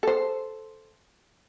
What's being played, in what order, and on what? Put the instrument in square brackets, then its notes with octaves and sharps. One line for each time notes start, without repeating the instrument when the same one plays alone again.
[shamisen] A4 C5